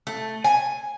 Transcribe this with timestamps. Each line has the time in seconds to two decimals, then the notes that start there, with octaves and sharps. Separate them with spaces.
0.07 A3
0.44 G#5